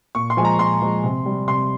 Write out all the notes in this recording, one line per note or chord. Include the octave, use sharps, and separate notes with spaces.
A#2 C#6
C6
F3 G#3 G#5
A#5
A#2 C6
F3 G#3
C3
G3
C3 C6